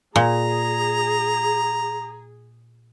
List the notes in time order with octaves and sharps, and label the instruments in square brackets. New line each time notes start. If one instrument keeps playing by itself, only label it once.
[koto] A#2 [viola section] G#4 [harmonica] A#5